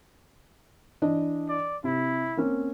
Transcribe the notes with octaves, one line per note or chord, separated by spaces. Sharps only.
E3 D4 D#5
D5
C3 E4
A#3 C4 C#4